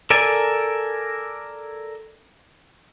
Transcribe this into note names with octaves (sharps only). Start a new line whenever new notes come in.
A4 A#4 D5 G#5